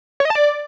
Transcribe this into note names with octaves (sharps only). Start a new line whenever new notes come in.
C#5
D#5
A5
D5